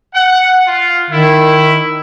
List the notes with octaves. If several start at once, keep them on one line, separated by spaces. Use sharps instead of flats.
F#5
F4
D#3 E4